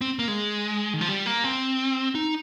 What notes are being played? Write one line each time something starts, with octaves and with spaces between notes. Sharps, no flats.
C4
A#3
G#3
D#3
F3
G3
A#3
C4
D#4